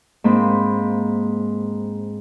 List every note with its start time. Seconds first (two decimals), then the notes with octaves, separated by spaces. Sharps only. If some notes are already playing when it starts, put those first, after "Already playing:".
0.24 G#2 A#3 C4 B5